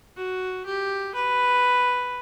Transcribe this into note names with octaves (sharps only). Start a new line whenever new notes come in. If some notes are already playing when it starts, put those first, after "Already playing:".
F#4
G4
B4